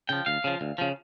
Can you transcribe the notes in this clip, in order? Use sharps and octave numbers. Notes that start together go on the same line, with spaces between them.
C#3 F3 G5
D2 F5
C#3 F3
D2
C#3 F3